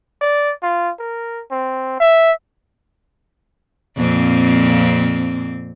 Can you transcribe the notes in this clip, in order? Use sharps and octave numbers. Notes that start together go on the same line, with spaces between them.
D5
F4
A#4
C4
E5
F2 A#2 C4